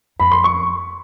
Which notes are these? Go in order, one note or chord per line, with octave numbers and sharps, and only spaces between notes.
F2 B5
C6
C#6